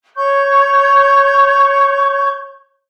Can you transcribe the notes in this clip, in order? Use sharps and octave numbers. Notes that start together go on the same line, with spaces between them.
C#5 C#6 G6